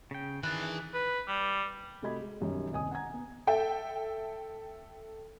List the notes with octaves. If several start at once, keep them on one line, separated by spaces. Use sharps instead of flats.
C#3 G5
D#3 E3 D4 G#4 B5 F#6 A6
B4
G3
C3 A3 F#4 D#5 B5 G#6
G#3
B1 F#2 D#3 G3
D#1 C2 D#5 G#5 D#6
F#5 G#5 A#5 G#6
B3
A4 E5 G5